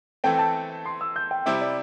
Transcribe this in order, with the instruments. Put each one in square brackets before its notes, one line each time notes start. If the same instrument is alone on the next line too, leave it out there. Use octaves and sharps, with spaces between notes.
[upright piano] E3 A3 C4 A4 [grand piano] G5
[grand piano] A5
C6
E6
G6
G5
[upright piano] C3 G3 E4 G4 C5 [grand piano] E5
[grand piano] D5